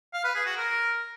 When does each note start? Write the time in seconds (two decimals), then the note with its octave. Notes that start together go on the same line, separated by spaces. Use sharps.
0.14 F5
0.24 B4
0.35 G#4
0.46 F#4
0.57 A#4